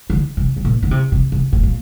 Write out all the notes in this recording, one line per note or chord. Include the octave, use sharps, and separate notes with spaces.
D3
C3
C3
A#2
D3
C3
C3
C3
A#2
A#2